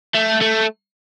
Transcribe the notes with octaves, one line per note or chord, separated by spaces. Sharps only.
A3
A3